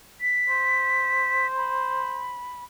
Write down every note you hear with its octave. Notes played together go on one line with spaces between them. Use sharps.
B6
C5
B5